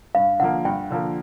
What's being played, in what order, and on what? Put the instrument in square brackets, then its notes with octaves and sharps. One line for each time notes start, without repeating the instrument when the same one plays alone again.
[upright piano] G2 [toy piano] F5
[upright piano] D3 F3 A#3 [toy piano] F#5
[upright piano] G2 [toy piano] G5
[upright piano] D3 F3 A#3